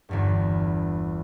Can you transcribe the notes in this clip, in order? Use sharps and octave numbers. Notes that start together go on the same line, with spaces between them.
G1 E2 G2